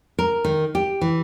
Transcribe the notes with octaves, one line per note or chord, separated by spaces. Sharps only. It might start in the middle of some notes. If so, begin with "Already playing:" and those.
A#4
D#3
G4
E3